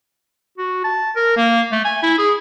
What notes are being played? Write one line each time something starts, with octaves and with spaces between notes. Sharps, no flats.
F#4
A5
A#4
A#3
A3
G#5
E4
G#4